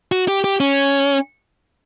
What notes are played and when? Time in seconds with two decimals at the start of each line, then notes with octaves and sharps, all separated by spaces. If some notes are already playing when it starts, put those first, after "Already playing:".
0.12 F#4
0.28 G4
0.44 G4
0.60 C#4